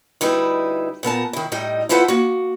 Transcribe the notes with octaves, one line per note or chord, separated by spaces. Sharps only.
D2 G3 D#4 E4 B4
A#2 B3 A#4 A5
D#3 E4
A2 G3 D#4 D#5
E4 F4 A4 B4 C5 F#5
A#3 F#4